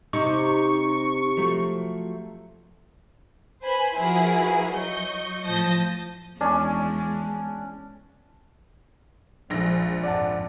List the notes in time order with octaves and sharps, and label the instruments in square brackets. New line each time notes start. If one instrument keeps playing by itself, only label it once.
[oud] C3 [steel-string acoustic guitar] D#4 [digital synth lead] C#6
[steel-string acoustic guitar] F3 F#3 A3
[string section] B4 C5 G#5 B5
F3 E4 F#4 G#4 A#4 B4
F#3 D#5 C#6 G6
A2 F3 A5 D#6 G6 A#6
[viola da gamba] E2 G#3 [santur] C#4 D4 A5
[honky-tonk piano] A#1 A#6 [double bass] F3 G#3
[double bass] F2 G#2 [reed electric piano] D5 F#5 A5